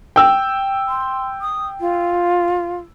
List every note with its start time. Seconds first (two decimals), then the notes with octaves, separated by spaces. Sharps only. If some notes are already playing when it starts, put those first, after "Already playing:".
0.16 G5 E6
0.88 C6
1.41 D#6
1.80 F4